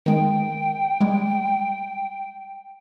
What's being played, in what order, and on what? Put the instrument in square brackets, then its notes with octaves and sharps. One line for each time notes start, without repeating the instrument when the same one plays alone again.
[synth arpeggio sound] D#3 G#3 [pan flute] G5
[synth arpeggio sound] G3 G#3